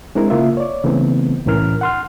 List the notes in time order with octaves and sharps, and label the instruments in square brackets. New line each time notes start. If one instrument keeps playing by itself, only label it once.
[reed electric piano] G#3 C4 D4 E4 A#4
C#3 A#3 F4 E5
C#5 D5
C#3 E3 A3 B3 C4
C2 A2 E3 C#4 A#4 F6
F#5 C6 F6